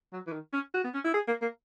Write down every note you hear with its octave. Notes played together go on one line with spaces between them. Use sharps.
F#3
E3
D#3
C#4
F#4
B3
C#4
E4
G#4
A#3
A#3